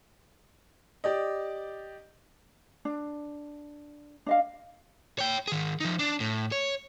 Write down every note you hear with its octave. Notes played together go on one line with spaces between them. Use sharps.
G4 D5 D#5
D4
D4 D#5 F5
C#5 G5
D#3 G#4
F3 D#4
D4
A2
C#5